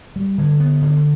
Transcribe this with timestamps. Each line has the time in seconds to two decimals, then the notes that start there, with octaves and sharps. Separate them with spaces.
0.16 G3
0.38 D3
0.60 B3
0.82 D3